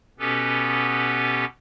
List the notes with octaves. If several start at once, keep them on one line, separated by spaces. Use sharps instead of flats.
B2 B3 C#4 G4 A4 B4